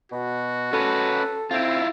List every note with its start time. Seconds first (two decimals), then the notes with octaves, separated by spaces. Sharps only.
0.12 B2 F#4
0.73 C#4 A4 B4
1.51 C4 E4 F4